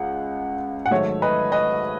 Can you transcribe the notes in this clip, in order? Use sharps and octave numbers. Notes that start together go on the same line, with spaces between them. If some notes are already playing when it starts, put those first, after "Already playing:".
Already playing: C#2 C#3 F#5
F#5
G#2 D#3 F#3 A3 C#5 E5
B4 D#5
B4 D#5